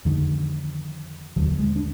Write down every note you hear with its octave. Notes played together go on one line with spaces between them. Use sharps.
F2 D3 D#3
D#2 D3 F#3
G#3
D4